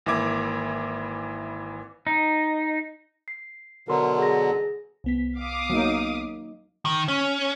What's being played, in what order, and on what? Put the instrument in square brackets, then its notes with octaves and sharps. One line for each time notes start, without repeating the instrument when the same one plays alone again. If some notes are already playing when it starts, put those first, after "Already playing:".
[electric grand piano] G#1 E3 A#3 E5 D6 G#6
[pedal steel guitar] D#4
[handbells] C7
[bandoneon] B2 D3 F#3 [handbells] A#4 C6
[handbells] G#4 A#6
[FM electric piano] C2 B3 B6
[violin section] F5 D6 D#6
[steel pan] F#3 A#3 D#4
[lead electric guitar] D#3
C#4